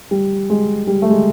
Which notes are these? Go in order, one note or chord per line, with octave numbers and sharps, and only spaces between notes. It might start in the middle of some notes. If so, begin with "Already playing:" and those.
G3
G#3
G3
A3
G#3